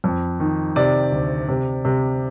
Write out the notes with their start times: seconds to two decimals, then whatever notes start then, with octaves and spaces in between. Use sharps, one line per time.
0.04 F2
0.40 D#3
0.76 C3 D5
1.12 D2
1.49 C3
1.85 C3